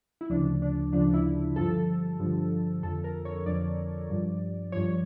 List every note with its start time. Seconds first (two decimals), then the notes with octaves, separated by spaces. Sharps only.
0.21 E4
0.30 D2 C#3 F3 D4
0.62 D4
0.93 D2 C#3 F3 D4
1.14 E4
1.56 G2 D3 F3 A4
2.20 G2 D3 F3
2.83 F2 D3 F3 A4
3.04 A#4
3.25 C#5
3.46 F2 D3 F3 D5
4.10 G2 F3
4.72 G2 F3 C#5